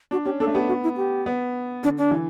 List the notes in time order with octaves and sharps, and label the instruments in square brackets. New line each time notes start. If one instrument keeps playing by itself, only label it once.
[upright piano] D4 [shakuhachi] F#4
[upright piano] C#4 [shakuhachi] G4
[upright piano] D4 [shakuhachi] A4
[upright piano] A3
[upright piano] B3 [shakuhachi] G4
[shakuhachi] F#4
E4
G4
[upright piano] B3
[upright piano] D3 [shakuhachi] D4
[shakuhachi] D4
[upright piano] E3